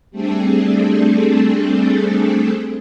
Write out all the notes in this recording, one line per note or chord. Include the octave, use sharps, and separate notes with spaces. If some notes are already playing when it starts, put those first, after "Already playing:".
G3 A3 C4 D4 G#4 A4